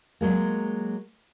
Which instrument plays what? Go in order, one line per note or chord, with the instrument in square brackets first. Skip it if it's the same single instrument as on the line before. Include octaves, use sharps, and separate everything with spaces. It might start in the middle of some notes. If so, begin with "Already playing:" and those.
[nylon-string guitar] F#3 G#3 A#3